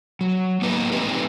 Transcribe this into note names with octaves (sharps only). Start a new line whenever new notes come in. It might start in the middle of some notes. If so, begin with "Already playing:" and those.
F#3
A#3 B3 D#4 B4
G#3 A3 C4 D#4 G4 B4